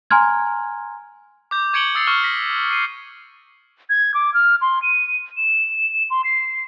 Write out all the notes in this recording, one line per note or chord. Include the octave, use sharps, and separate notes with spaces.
G#5 A#5 C6 F6 G#6
D6 G6
C#6 G#6 C#7 D7 F#7 G7
D#6 E6 A6 C7 C#7
C#6 F6 G7
A#6 B6
C7 D#7
G#6
D6
F6
C6
D#7
E7
C6
C7